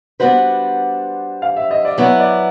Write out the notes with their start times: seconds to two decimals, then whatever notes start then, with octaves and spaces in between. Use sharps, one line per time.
0.20 G3 B3 D4 F#4 B4 C5
1.42 F5
1.56 E5
1.71 D#5
1.85 D5
1.98 F#3 B3 E4 C#5
2.20 D5